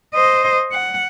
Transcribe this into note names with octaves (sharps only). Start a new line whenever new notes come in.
C5 D#5
F#5